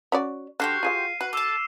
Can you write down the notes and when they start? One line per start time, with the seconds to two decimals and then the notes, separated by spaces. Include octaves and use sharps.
0.12 C#4 F#4 D5
0.60 D3 F#4 G4 C5 F6 C7
0.83 F4 G#4 F5 F6 C7 D#7
1.21 F#4 B4
1.33 A4 A5 D6 E6 E7